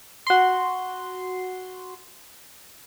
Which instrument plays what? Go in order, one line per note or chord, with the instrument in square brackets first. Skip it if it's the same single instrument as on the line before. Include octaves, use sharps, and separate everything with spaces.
[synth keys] F#4 C6